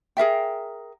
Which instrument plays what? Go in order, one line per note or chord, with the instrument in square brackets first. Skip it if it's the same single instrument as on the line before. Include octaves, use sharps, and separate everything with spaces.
[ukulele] G#4 A#4 E5 G5